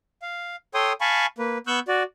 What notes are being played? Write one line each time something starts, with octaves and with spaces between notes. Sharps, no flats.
F5
A4 C#5 G5 C6 D#6
F5 G#5 A5 B5 C#6
A#3 B4
B3 C#6 E6 F#6 G6
F#4 D5